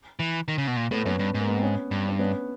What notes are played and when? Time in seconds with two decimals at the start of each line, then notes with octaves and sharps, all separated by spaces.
0.20 E3
0.48 D#3
0.58 C#3
0.67 B2
0.76 A#2
0.91 A2 A3 B3
1.06 F#2 B3 C#4
1.19 G2
1.34 G#2
1.40 A#3
1.48 B3
1.55 C4
1.63 B3 C#4
1.91 G2
2.09 D4
2.19 B3 C#4